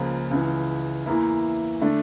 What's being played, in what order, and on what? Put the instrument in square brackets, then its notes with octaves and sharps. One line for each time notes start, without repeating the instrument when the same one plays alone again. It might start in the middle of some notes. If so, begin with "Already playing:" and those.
Already playing: [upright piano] C#2 C#3 F3 A#3
C#2 C#3 E3
E2 E3 A#3 E4
D3 A3 D4